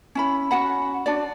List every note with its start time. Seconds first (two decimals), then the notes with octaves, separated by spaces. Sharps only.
0.15 C#4 E4 B5
0.51 C#4 F#4 F#5 B5
1.06 D4 F#4 D5